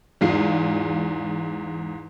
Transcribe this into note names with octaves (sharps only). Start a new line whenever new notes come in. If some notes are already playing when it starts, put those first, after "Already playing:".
E2 G#2 F4 C7